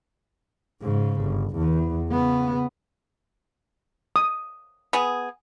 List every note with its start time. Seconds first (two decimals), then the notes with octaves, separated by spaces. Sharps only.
0.82 G#2 C#3
1.22 G1
1.57 E2
2.10 C#3 B3
4.16 D#6
4.93 B3 G#4